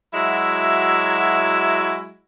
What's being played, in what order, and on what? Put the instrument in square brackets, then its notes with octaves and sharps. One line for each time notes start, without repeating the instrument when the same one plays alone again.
[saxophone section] F#3 G#3 E4 F#4 E5